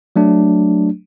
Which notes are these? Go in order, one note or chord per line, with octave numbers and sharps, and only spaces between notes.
F#3 A3 D4